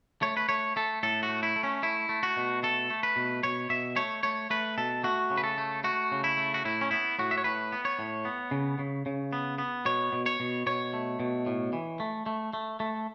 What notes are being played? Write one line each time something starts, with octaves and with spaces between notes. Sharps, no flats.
A3 C#5
B4
A3 C#5
A3 A4
A2 A4
F#4
A3
E4
A3
C#4
A3 E4
A3
F#4
B2
A3 A4
A3
B4
B2
B2 C#5
B2 E5
A3 C#5
A3 C#5
A3 B4
B2 A4
A3 F#4
C#3
B4
A4
A3
A3 F#4
C#3
E4
A3
F#4
A2 E4
C#4
B3 E4
A2 F#4
E5
C#5
A2 B4
B3
C#5
A2
B3
C#3
C#3
C#3
B3
B3
B2 C#5
B2
C#5
B2
B2 C#5
A3
B2
A2
E3
A3
A3
A3
A3